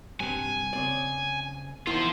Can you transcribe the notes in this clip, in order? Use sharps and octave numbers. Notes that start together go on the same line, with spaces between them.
G2 C3 G#5
C#3 C4 D5
E2 D#3 E4 F4 C5